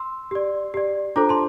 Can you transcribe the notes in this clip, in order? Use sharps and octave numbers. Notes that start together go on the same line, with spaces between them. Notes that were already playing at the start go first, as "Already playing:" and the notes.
Already playing: C6 E6
G4 D5
G4 D5
D4 F4 A4 C5 A#5 D6
A5 C6